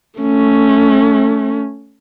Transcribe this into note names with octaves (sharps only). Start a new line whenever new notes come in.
A3 C#4